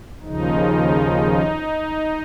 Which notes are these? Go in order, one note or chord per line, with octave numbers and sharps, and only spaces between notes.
D#2 C#3 F3 D#4